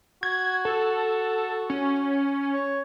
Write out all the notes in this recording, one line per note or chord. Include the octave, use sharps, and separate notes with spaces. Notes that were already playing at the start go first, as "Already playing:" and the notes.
F#4 G#6
A4
C#4
C#5